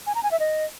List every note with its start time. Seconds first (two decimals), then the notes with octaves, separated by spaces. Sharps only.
0.07 G#5
0.15 A#5
0.23 G#5
0.31 E5
0.40 D#5